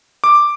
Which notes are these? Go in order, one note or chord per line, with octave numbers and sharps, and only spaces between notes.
D6